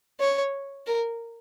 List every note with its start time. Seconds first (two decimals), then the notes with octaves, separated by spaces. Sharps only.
0.20 C#5
0.87 A#4